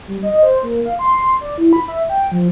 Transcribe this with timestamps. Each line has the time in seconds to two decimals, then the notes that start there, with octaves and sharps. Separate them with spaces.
0.07 G3
0.23 D#5
0.43 C5
0.63 A#3
0.86 F5
0.99 C6
1.41 D5
1.58 E4
1.73 B5
1.88 E5
2.09 G5
2.32 F3